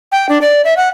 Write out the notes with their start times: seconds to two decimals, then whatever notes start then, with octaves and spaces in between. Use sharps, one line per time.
0.12 G5
0.29 D4
0.42 D5
0.65 E5
0.77 F#5